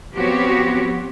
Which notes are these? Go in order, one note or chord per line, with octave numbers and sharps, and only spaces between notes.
F3 B3 C4 F#4 G4 C#5